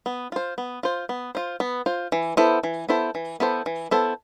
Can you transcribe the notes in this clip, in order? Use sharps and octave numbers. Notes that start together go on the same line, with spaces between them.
B3
F4 C5
B3
F4 C5
B3
F4 C5
B3
F4 C5
E3
B3 E4 A4 C5
E3
B3 E4 A4 C5
E3
B3 E4 A4 C5
E3
B3 E4 A4 C5